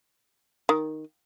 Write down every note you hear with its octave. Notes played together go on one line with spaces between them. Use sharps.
D#3